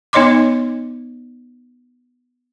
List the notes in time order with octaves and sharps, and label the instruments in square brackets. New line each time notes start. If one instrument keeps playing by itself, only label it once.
[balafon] B3 D#4 C#5 D#5 C6 D6